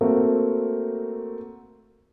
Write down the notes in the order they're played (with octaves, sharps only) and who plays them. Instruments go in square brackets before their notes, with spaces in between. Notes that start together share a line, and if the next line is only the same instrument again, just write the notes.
[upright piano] A3 A#3 C4 F#4 A#4